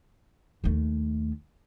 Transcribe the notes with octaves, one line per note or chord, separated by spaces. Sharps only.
D#2 A3